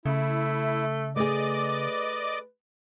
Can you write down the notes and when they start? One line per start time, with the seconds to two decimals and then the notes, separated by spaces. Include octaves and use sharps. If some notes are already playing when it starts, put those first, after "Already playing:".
0.06 C#3 A3 E4
1.16 A3 G#4 B4 D5 D#5 D6